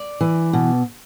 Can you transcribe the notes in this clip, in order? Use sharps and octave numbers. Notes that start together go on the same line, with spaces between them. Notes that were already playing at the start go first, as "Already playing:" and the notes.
Already playing: D5
E3
B2